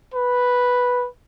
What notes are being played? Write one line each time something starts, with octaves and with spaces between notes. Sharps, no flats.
B4